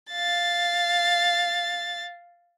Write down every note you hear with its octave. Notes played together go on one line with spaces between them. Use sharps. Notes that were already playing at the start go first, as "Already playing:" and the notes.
F5 A6